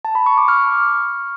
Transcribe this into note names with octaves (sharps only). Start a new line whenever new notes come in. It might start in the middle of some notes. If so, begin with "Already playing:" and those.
A5
B5
C#6
D6
C#6 F6